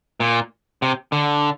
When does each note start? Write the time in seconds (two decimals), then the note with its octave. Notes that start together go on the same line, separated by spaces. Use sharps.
0.20 A#2
0.82 C3
1.12 D3